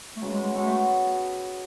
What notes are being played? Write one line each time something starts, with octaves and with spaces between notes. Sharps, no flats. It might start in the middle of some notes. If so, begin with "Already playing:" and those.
A3
C#3 F#3 G#3 B3
G#3
G#3
A3
F#3 G#3 B3 F#4 A4
A3